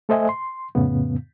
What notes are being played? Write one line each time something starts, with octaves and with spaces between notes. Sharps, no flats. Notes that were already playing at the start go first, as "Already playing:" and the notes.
A3 A4 C5 D#5 E5 G#5
C6
F2 A2 C#3 B3